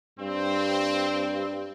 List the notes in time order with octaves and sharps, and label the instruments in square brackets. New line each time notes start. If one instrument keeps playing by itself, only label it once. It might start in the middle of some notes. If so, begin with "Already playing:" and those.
[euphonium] G2 [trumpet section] C4